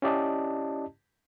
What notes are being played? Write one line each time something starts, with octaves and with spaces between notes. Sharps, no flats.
C#4 E4 G4 D5 D#5 A5